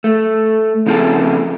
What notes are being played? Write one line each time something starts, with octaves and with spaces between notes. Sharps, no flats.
A3
C#3 F3 C4 F4 G#4 A4